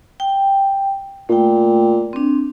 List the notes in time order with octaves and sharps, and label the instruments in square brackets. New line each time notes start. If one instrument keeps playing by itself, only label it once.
[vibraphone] G5
[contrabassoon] A#2 [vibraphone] A3 G5
[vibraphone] C4 D4